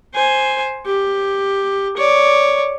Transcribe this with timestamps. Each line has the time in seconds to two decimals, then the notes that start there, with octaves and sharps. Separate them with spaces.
0.14 C5 G#5
0.86 G4
1.97 C#5 D5